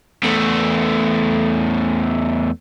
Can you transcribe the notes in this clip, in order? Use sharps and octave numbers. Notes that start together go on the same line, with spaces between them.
E2 A3